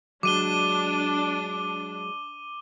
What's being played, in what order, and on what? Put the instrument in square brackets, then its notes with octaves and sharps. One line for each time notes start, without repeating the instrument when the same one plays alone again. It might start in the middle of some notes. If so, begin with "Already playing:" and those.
[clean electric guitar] F#3 G#3 [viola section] D4 [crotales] D6 D#7 G7